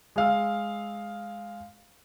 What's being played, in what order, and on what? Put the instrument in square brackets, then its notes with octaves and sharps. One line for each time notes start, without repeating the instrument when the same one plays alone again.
[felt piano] G#3 F5 E6